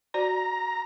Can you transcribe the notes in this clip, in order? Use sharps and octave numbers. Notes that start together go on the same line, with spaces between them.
F#4 C5 D5 A#5